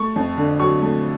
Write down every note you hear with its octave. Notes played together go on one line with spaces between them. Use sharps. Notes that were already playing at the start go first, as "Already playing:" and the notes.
Already playing: A3 C#6
F2
D3
F#3 C#6
A3